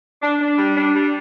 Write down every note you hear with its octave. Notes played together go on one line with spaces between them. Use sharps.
D4
D4
G3
D4
G3